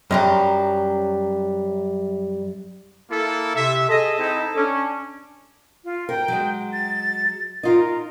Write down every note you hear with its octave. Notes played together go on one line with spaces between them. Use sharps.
F#2 F#3 G3
A#3 E4 A4
C3 E5
G#4 A4 D#5
C4 D#4 E4
C#4 D4
F4
A#4 G5
F#3 G#3
A6
D#4 F4 A#4